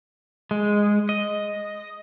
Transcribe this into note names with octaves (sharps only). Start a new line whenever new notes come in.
G#3
D#5